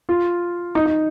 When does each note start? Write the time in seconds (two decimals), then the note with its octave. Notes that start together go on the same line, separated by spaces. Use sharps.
0.09 F4
0.75 D#4
0.86 D#4